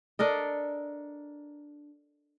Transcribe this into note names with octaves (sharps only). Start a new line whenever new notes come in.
D4 A4 A#4 D#5